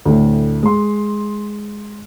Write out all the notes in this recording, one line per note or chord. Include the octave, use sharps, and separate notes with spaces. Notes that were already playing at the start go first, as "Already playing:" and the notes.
D2 A2
G#3 C6